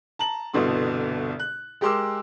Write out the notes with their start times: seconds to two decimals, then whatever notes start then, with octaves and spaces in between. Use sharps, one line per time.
0.19 A5 A#5 F#7
0.53 G1 C2 B2 D3 B3 C6
1.40 F#6
1.81 G#3 G4 A#4 C6 D6 E6